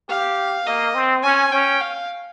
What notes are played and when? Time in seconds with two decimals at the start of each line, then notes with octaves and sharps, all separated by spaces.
0.09 G4 F5
0.66 A#3 D#5
0.95 C4
1.23 C#4 G#5
1.52 C#4 G5
1.81 F5